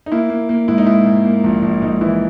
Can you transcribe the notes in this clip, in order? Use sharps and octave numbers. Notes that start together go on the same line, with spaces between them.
D#4
A#3 E4
A#3
A#3
G#2 E4
D#4
G#2 E4
G#2
A#3
A#1
A#1
G#2 D#4
E3 E4